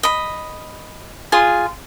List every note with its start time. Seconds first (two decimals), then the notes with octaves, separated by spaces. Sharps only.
0.03 D#5 B5
1.32 F4 G#4 C6